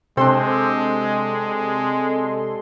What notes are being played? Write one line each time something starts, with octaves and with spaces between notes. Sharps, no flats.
C3 G#3 C4 D4 A4 C6